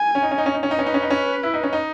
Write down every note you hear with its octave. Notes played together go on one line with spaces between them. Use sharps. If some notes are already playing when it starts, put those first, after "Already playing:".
Already playing: G#5
C#4
D#4
C#4
D#4
C#4
D#4
C#4
D#4
C#4 B4
D#4
C#4
D#4
C#4
E4
D#4
C#4
D#4